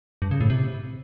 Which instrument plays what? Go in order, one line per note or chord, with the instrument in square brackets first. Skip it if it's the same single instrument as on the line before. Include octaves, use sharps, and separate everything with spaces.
[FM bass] G2
C#3
A2
C3